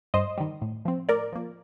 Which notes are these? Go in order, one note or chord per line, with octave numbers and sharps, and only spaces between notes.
G2 C5 D#5
D#3 G3
A2
F3 C4
A2 A#4 D5
F3 A#3